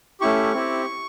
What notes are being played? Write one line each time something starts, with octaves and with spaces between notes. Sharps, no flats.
A3 C#4 E4 G4 C#6
C4 E4 G4